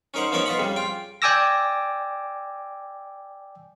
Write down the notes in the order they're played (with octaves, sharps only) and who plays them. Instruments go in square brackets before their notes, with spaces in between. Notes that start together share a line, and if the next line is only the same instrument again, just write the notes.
[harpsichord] C#4 D#4 A#4 C5 F#5
F3 B3 C#4 D#4 A#4 C#5
F4 B4 D#5 F#5 B5
F2 C#3 G3
F4 G5
[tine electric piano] D5 G5 G#5 D6 E6 A#6